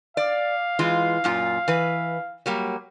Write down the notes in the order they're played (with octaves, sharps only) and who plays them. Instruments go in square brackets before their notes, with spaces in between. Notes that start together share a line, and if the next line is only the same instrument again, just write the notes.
[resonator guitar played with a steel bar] D5 [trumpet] F5
[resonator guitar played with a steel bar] E3 G#3 F4
F#2 A#2 F4
E3 B4
F#3 G3 A#3